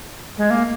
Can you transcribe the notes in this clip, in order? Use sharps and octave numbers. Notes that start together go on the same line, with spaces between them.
G#3
A#3